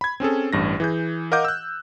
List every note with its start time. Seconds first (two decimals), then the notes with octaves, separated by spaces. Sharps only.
0.01 B5 G#6
0.20 C4 C#4 G#4 A4
0.53 A1 G2 A#6
0.80 E3 G#4 G6
1.32 A#4 D#5 F5 F#5 D6 G6
1.45 E6 F#6